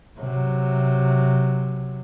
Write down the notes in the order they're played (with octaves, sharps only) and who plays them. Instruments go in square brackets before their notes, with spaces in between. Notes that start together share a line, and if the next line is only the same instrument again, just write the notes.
[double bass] C3 F#3